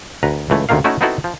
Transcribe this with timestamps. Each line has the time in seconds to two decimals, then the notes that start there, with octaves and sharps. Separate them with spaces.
0.23 D2 B4 A#5
0.50 C#2 E3 A3
0.69 D2 C3 D#3 A#3 F5
0.84 A3 C#4 D#4 E4 F#4
1.01 B3 C4 D#4 E4 F#4 A4
1.24 F3